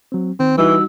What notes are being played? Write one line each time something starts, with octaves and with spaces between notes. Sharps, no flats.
F#3 C4
D#3 C4
E3 G3 D#4 F#4 E6